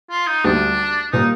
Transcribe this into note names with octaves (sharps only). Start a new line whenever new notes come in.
F4
D#4
D2 D3 G3 D4
A#2 G3 A#3 D#4